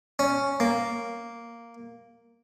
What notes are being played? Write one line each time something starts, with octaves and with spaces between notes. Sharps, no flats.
C#4
A#3